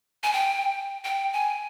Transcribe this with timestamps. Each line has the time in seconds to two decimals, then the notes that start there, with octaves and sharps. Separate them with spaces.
0.23 G#5
0.33 G5
1.04 G5
1.33 G#5